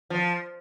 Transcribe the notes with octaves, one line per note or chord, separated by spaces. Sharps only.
F3